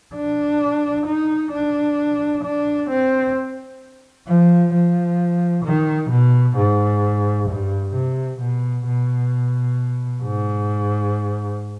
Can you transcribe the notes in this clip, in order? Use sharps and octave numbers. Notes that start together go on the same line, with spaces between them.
D4
D#4
D4
D4
C4
F3
F3
D#3
B2
G#2
G2
C3
B2
B2
G#2